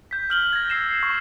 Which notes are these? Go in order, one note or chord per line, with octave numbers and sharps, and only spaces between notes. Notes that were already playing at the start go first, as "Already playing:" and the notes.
G6 B6
F6 F#7 G7
G#6 A#6
E6 C7 E7
C#6